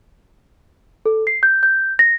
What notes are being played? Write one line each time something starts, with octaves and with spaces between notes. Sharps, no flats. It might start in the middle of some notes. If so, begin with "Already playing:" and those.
A4
C7
G6
G6
A#6